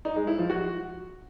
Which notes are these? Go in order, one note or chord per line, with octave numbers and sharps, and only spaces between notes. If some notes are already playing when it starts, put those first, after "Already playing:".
D#4
G#3
E4
F3
F#4